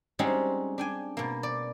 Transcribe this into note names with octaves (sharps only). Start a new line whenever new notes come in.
G3 G#3 C4 C#4 D#4 F#4
D4 G5 G#5
B2 A#3
D5